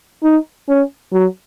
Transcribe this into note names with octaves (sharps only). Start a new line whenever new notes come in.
D#4
C#4
F#3